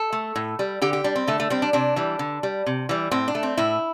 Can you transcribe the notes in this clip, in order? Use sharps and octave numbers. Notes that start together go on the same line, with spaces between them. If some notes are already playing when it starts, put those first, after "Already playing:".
Already playing: A4
A3
A2
G3
D3 G4
G4
G3 D4
C4
D3 A3
A3
G3 C4
D4
C3 D4
E3 G3
D3
G3
C3
E3 G3
A2 C4
D4
A3
C4
A2 E4